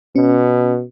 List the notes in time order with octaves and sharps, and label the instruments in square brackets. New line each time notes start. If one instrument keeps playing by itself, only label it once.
[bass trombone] B2 [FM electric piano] C#4